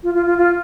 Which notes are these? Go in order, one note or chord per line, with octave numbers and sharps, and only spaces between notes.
F4
F4
F4
F4